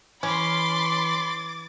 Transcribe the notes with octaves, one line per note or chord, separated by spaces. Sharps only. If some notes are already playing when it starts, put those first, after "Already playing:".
E3 C#4 B5 C6 D6 A6